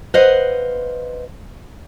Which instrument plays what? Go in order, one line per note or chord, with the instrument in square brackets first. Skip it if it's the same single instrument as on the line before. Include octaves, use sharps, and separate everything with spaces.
[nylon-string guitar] B4 C5 D#5 F5 F#5